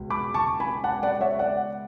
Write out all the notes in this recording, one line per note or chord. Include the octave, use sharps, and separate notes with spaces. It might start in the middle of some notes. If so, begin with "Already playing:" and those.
Already playing: C#2 B2 G#3
B5 D6
A5 C#6
G#5 B5
F#5 A5
D5 F#5
C#5 E5
D5 F#5